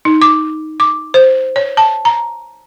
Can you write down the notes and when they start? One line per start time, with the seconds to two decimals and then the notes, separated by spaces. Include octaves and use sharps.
0.05 D#4
0.22 D6
0.80 D6
1.14 C5
1.56 C#5
1.77 A5
2.05 A#5